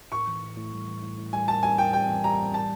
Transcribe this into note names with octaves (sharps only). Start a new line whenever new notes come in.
A2 C#6
E3
A2
A2
G3
E3
A2
A2
G3 G#5
G3 A5
G3 G#5
A2 G5
G3 G5
E3
G3 A#5
A2
A5